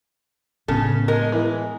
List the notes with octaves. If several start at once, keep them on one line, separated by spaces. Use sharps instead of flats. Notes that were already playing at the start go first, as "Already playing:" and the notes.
A2 C#3 B3 A4
G#3 A#4
E3 E4